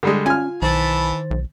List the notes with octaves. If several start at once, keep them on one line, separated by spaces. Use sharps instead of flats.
D3 G3 G#3
C#4 F4 G#5 F6
B1 D#3 E3 C5 A5 B5 A6
B1